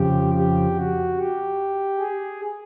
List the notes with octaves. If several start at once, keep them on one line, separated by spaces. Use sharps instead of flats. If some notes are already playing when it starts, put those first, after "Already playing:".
Already playing: F2 C#3 F3 G4
G4
F#4
G4
G#4